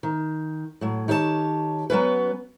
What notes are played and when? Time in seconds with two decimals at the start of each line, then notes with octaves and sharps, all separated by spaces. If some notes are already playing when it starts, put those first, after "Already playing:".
0.03 D#3
0.81 A2 F#3
1.08 D#3 G4 C#5 D#5 A5
1.90 F#3 B3 C#4 B4